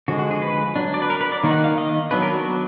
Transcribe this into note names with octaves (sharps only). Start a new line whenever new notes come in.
D3 F3 G#3 F#4
F#4
G#4
B4
F#3 D4
D5
B4
A#4
B4
D5
D#3 A#3 D#4
F#5
F5
D#5
F#3 B3 D4 B4
A#4
F#4